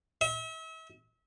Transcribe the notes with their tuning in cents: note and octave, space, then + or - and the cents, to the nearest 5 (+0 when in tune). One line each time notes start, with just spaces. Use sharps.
E5 -40